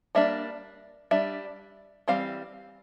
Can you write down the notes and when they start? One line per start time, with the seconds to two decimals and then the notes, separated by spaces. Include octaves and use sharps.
0.15 G3 A#3 D4 E5
1.11 G3 D4 E5
2.08 E3 G3 C4 F5